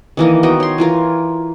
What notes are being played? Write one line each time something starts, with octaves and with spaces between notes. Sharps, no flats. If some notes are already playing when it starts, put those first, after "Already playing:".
D#3 E3 A#3 D#5
B3 F#4 D#5 G5
C#5 C6
E3 F4 A#4